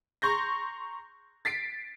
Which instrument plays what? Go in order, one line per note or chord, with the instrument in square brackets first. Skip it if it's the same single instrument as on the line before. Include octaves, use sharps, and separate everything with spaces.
[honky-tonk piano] A#5 C6 C#6 G6 A#6
A6 B6 C7 D7